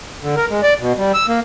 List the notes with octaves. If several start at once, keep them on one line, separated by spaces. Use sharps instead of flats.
D3
A#4
G#3
D5
B2
G3
E6
A#3